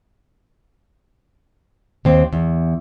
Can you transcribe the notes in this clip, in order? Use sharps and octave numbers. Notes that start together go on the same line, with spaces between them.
D#2 C4
E2